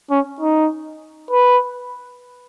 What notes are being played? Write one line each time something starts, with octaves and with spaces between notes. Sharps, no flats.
C#4
D#4
B4